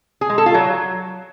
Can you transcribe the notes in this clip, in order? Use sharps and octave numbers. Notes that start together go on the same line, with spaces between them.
G#4
G#3
A4
F4
F#3